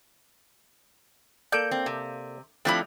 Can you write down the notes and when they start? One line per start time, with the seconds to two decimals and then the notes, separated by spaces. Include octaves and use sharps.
1.52 A#3 A4 D5 G6
1.71 C4
1.86 C3
2.65 F3 A3 C4 D4 E4 G4 B5